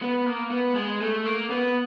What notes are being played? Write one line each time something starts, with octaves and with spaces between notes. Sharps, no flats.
B3
A#3
B3
G#3
A3
A#3
B3